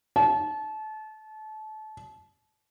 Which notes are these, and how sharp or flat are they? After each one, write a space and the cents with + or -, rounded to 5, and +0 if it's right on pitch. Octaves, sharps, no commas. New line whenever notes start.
A5 -30